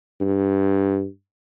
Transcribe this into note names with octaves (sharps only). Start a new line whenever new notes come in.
G2